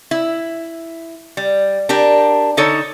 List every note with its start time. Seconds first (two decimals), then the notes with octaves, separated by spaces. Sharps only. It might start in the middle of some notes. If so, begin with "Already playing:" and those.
0.11 E4
1.37 G3
1.89 D4 G4 A#4
2.57 D3 D#4 A4 C#5